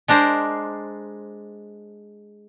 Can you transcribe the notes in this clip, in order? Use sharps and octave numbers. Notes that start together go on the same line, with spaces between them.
G#3 D4 A#4 C5